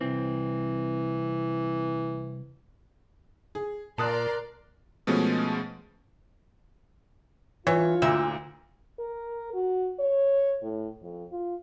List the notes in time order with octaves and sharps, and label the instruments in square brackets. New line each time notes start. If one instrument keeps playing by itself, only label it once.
[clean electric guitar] C2 C4 [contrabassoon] E3
[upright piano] G#4
[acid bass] A#2 [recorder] A#4 [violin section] D5 A#5 C6 [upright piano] A5 D#6 F#6
[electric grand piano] B2 F3 G#3 A3 B3 C#4
[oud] E3 [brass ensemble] F4 [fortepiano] C#5
[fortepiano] D2 A#2 [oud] E5
[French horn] A#4
F#4
C#5
A2
F2
F4